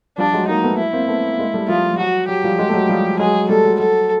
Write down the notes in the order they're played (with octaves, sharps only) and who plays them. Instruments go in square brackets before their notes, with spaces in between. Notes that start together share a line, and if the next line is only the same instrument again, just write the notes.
[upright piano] F3 G3 [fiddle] D4
[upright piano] F#3 G#3
[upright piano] G#3 A#3 [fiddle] D#4
[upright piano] A3 B3
[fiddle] E4
[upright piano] A#3 C4
A3 B3
B3
G#3 A#3
G3 A3
[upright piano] F3 G3 [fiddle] F4
[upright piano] G3
[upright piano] F#3 [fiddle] F#4
[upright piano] F#3 [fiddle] G4
[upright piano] F3 G3
F#3 G#3
A3
F#3 G#3
F3 G3
[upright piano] F#3 G#3 [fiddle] G#4
[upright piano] G3 A3 [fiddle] A4
[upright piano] F#3
[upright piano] F#3 [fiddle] A4